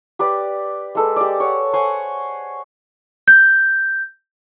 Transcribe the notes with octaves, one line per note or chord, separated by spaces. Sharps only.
G4 B4 D5
G#3 A4 B4
G4 D5
C#5 F#5
C5 C#5 F#5 G#5
G6